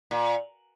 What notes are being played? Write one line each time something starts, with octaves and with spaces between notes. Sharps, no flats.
A#2